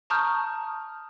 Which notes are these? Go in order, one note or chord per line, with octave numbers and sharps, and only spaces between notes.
A5 A#5 C#6 D#6 F6 G6